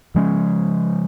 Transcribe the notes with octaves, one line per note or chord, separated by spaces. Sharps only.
C#3 F3 G#3 C#4